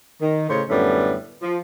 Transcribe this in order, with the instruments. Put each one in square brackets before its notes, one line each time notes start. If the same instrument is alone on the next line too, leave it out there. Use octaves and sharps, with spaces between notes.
[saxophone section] D#3
A2 C#3 C5 C#5
F#2 A2 D3 G3 B3
F3